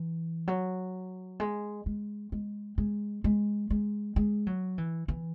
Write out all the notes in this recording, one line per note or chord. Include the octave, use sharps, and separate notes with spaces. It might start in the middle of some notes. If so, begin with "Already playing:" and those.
Already playing: E3
F#3
G#3
G#3
G#3
G#3
G#3
G#3
G#3
F#3
E3
E3